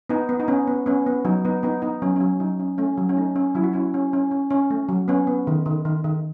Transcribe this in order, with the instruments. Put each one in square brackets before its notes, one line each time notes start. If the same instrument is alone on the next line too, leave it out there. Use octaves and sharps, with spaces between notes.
[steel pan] B3 D#4
B3
D#4
B3 C#4
B3
B3 C#4
B3
F#3 D#4
B3 D#4
B3 D#4
B3 D#4
F#3 C#4
F#3 C#4
F#3 D#4
C#4
A3 C#4
F#3
C#4
A3 D#4
C#4
F#3 E4
F#4
C#4 E4
C#4
C#4
C#4
C#4
A3
F#3
B3 C#4
B3
D#3
D#3
D#3
D#3